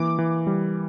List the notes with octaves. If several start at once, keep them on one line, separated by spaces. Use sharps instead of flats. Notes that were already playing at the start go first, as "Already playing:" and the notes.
Already playing: E3 A#3 D6
E3
G3